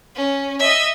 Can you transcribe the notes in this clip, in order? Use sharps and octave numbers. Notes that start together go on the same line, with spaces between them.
C#4
D#5 E5